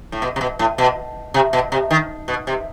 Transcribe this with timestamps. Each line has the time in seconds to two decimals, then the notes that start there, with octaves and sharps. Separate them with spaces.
0.12 A2
0.22 B2
0.36 C3
0.41 B2
0.59 A2
0.78 B2
1.34 C3
1.53 B2
1.72 C3
1.91 D#3
2.28 B2
2.47 C3